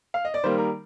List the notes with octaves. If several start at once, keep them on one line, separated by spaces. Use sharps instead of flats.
F5
D#5
D5
D#3 G3 A#3 C5
A#4